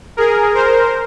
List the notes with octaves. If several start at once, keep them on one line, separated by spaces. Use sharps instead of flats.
G#4 A#4
A#4 C5